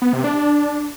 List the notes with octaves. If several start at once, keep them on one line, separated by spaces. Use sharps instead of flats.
B3
C3
D4